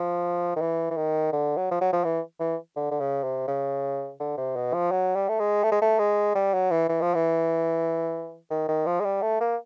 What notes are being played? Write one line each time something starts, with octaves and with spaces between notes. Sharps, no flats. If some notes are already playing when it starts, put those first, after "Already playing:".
Already playing: F3
D#3
E3
E3
D#3
D3
F#3
F3
F#3
F3
E3
E3
D3
D3
C#3
C3
C#3
D3
C3
B2
F3
F#3
G3
A3
G#3
A3
G#3
A3
G#3
G3
F#3
E3
E3
F3
E3
D#3
D#3
F3
G#3
G3
A3
A#3